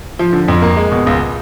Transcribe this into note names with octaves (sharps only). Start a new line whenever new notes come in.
F3
D3
F2
A#3
G#3
B2
C#2